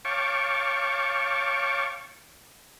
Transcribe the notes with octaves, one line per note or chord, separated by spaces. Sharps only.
C#5 F5 G5 A5 C#6 D6